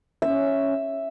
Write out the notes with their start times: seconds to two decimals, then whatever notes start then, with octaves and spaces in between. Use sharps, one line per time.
0.22 C#4 E5